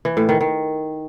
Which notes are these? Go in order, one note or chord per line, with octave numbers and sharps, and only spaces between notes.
E3
A2
D#3
D#3